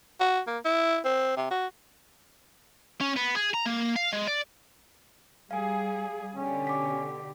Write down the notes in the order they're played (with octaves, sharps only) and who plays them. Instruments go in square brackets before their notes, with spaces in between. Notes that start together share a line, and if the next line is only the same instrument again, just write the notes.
[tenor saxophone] F#4
A#3
E4
C4
C3
F#4
[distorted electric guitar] C#4
B3
G#4
A#5
A#3
F5
G#3
D5
[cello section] G3 G#4 [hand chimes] F5 G#5
[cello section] B2 D3 G4 [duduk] C#4
[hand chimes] D6 B6